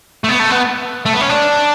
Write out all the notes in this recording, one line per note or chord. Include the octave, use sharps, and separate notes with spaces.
A3
B3
A3
B3
A3
B3
C#4
D4